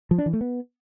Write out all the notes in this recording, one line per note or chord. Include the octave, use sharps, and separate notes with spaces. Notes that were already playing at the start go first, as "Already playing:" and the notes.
F3
D4
E3
A3
B3